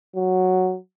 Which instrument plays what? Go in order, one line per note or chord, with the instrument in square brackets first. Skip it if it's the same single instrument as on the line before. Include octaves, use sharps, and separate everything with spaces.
[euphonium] F#3